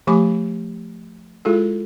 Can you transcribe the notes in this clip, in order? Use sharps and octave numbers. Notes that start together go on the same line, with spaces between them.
F3 A3 G4 G#5 B5 D6
G#3 E4 F4 G#4 A4